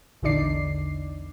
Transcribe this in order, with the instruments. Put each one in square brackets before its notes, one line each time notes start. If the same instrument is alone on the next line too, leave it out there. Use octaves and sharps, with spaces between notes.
[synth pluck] A#1 E2 D3 D#4 D5 C7